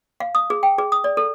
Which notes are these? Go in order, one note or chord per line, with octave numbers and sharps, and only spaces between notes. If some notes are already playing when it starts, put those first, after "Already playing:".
F5
D#6
G#4
G5
G#4
D#6
D5
A4